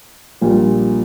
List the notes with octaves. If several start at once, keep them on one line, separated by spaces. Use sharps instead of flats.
A#1 A#2 G3